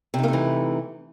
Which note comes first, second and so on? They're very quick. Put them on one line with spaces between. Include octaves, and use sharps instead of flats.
C3 D#4 A#3 A3 E3